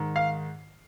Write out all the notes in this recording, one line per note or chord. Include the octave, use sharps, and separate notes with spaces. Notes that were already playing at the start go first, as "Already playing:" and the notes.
Already playing: G#2 D#3
F5